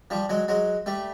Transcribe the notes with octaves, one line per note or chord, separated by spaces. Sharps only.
F3 G3
F#3 G#3
F#3 G#3
G3 A3